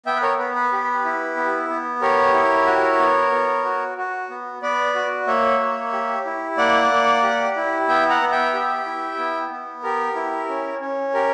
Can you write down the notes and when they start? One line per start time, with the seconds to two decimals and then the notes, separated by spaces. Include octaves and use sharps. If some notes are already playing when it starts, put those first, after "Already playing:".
0.06 B3 E5 G5
0.16 B4
0.22 A#4 C#5
0.39 B3 B4
0.55 B4
0.72 G4
1.04 E4
1.37 B3
1.70 B3
2.01 G4 A#4 C#5
2.34 E4
2.66 F#4
3.00 B3
3.32 B3
3.65 F#4
3.98 F#4
4.30 B3
4.62 B3 B4 D5
4.95 F#4
5.27 A#3 C#5 E5
5.60 A#3
5.93 G4
6.25 E4
6.58 A#3 D5 F#5
6.91 A#3
7.23 G4
7.56 E4
7.88 B3 E5 G5
8.10 F#5 A#5
8.21 B3
8.32 E5 G5
8.54 G4
8.86 E4
9.18 B3
9.50 B3
9.83 G4 A#4
10.16 E4
10.48 C#4
10.81 C#4
11.14 G4 A#4